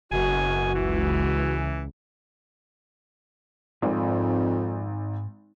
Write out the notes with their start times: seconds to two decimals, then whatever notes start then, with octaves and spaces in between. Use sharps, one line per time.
0.12 F#1 F#2 B2 F#4 G#5
0.74 C#2 E3
3.82 G#1 F2 G#2